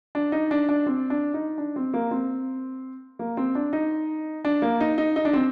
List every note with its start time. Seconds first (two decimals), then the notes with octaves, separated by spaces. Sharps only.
0.15 D4
0.32 D#4
0.51 D4
0.69 D4
0.86 C4
1.10 D4
1.34 D#4
1.58 D4
1.76 C4
1.94 A#3
2.11 C4
3.19 A#3
3.37 C4
3.55 D4
3.73 D#4
4.45 D4
4.62 A#3
4.81 D#4
4.98 D#4
5.16 D#4
5.25 D4
5.33 C4